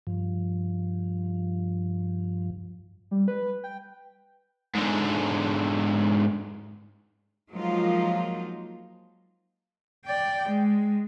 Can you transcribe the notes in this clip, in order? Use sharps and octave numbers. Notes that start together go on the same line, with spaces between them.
G2 F3
G3
B4
G5
G#2 D3
F3 F#3 G#3 A#3 D#4 F4
D5 G5
G#3